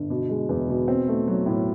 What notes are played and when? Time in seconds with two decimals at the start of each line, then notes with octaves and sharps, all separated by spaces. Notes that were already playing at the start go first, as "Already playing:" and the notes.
Already playing: G1
0.10 B2
0.29 G#3
0.49 E2
0.69 B2
0.88 C4
1.08 A3
1.28 F#3
1.46 A2